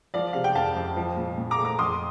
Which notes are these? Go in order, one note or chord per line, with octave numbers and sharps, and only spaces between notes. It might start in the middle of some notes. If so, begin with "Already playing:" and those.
F3 D5 F5
C3 F5
G5
F2 F5 A5
F2
F3
A#2
A#2
A#5 D6
A3
A#5 D6
F2 C6 D#6